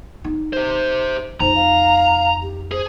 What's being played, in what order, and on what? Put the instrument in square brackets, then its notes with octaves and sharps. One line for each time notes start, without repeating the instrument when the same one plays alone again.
[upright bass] D#4
[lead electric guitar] G4 C5
[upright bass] F2 D#4 [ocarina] C5 [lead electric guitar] A#5
[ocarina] F5
G4
[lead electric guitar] G#4 [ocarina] C5